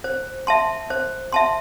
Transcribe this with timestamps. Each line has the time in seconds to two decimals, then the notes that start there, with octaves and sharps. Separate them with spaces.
0.04 C5
0.47 E5 A5 C6
0.90 C5
1.32 E5 A5 C6